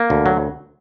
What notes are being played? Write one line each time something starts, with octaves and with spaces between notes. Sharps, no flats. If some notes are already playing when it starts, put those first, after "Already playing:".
Already playing: A#3
D2
F#3